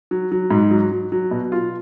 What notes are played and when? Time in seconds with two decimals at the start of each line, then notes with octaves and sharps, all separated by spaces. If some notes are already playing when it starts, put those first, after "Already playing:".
0.11 F#3
0.32 F#3
0.51 G#2
0.71 F#3
0.91 F#3
1.12 F#3
1.31 B2
1.52 F4